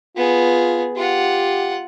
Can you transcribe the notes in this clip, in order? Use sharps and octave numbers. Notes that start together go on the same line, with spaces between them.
B3 F4 G#4
F4 G4 F#5